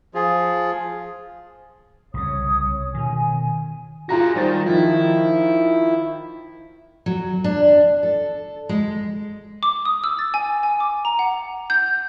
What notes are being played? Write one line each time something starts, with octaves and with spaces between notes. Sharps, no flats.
F3 F4 G#4
C2 C#3 C#5 D#6
B2 D#3 G#5
F4 F#4 G#4 A#5 A#6
D#3 G3 C5 A6
D#3 F3 E4
F#3
D4
A4
G#3
D6
D#6
E6
A6
G#5
G#5
D6
A#5
F#5
G6